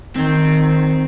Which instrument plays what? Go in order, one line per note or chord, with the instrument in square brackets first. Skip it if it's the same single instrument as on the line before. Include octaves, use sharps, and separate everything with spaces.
[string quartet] D#3 [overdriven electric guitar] C4